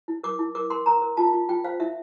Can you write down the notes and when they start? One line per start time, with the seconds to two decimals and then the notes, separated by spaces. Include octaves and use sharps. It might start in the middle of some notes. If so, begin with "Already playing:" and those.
0.08 E4
0.23 A#4 D6
0.39 E4
0.55 A#4 D6
0.70 A#4 C6
0.86 A#4 A#5
1.02 A#4
1.17 F4 A5
1.33 F4
1.49 F4 G5
1.64 C5 F5
1.80 E4 E5